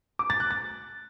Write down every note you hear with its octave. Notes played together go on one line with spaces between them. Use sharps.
D6
A6
F#6
A6